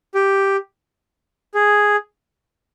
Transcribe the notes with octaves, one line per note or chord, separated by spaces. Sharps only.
G4
G#4